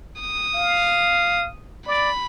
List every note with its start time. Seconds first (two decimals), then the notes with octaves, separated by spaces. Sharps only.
0.21 D#6
0.55 F5
1.87 D5 B5